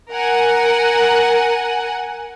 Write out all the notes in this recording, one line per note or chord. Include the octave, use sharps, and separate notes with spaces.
A#4 F#5 G#5